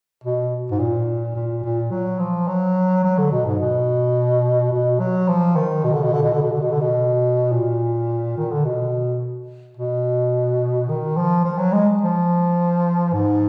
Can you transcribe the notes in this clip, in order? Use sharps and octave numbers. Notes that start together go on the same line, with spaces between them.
B2
G#2
A#2
A#2
A#2
F#3
F3
F#3
F#3
D3
B2
G#2
B2
B2
F#3
F3
D#3
B2
D3
B2
D3
B2
D3
B2
D3
B2
D3
B2
A#2
D#3
D3
B2
B2
D#3
F3
F3
F#3
G#3
F3
G#2